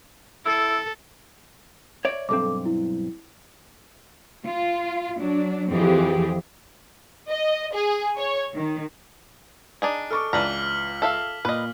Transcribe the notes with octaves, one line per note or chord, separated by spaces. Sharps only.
E4 A4
C#5 D5 E5
B1 G2 C4 A4 D6
E4
F4
F#3 D4
F2 E3 F3 C4 G4 G#4
D#5
G#4
C#5
D#3
D4 D#4 G#4
A4 C#6 D6 F6
C#2 E3 D4 A#5 F6 B6 F#7
A4 E5 F5
A#2 B4 D#5